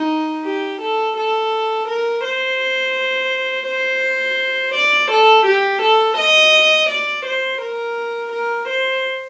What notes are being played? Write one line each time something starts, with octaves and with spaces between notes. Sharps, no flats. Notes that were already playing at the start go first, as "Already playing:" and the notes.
Already playing: D#4
G4
A4
A4
A#4
C5
C5
D5
A4
G4
A4
D#5
D5
C5
A#4
A#4
C5